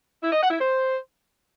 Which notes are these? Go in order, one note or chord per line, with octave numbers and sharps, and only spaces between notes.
E4
D#5
F#5
E4
C5